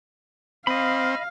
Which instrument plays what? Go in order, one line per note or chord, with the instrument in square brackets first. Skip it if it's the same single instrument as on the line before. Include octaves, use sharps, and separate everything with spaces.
[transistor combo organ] C4 [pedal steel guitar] D#5 B5 [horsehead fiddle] F5